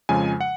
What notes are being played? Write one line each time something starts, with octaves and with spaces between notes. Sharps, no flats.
F2 C#3 F3 G#3 G#5
F#5